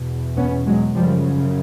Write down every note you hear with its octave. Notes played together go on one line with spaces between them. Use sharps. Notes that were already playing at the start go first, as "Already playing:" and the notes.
Already playing: E2 B2
B3 C#4
F#3 G#3
F#2 C#3 F3 G3